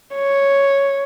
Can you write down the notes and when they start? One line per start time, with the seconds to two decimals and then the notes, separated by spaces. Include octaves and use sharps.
0.15 C#5